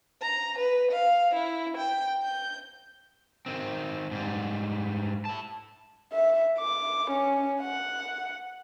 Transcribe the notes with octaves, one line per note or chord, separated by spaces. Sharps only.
A#5
B4
F5
E4
G5
G6
D#3 C4
G#2 G3
E4 A5
E5
D6
C#4
F#5